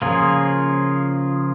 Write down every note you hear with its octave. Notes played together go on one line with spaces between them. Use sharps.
C#3 F3 A#3 F4 G#4